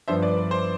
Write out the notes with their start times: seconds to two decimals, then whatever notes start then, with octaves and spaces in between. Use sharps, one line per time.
0.08 G2 F3 B3 D4 C5 E5
0.22 B4 D5
0.37 B4
0.51 C5